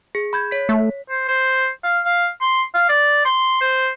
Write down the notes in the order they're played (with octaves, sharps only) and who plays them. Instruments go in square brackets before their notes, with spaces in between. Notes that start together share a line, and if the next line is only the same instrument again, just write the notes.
[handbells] G#4
B5 G6 G#6
C#5 B6
[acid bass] A3
[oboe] C5
C5
F5
F5
C6
F5
D5
C6
C5